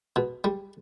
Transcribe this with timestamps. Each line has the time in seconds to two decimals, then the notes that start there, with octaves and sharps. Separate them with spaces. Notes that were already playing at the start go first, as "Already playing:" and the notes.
0.16 B2
0.44 G3